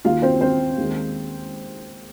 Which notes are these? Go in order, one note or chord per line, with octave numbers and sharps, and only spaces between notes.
D#2 D#3 A#3 F4 F5
C4 C5
C4 C5
D#2 D#3 G#3